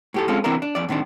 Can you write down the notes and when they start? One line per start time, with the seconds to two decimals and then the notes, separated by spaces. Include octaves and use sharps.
0.14 A2 G4 A4
0.28 G#3 C4 C#4 F4 A4
0.44 C3 E3 C4 D4 A#4
0.62 D4
0.75 F2 D5
0.89 A2 D#3 C4 D4